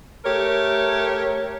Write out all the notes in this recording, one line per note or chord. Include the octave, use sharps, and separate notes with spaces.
A3 G4 A#4 C#5